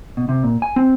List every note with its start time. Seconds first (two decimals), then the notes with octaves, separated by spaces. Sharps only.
0.17 B2
0.29 C3
0.44 A#2
0.62 G#5
0.76 C4